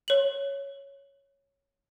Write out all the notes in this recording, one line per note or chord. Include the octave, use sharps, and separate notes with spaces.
C#5 F#7